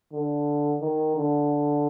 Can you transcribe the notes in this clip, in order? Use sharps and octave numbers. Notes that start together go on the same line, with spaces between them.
D3
D#3
D3